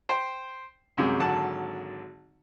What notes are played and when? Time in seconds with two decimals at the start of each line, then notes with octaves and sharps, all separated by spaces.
0.09 C5 G5
0.97 C2 F#2 C3 G#3
1.20 G#1 D3 F#3 F#5 A5